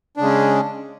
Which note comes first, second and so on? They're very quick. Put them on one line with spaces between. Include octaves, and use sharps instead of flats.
D4 C#3 G#3 C#4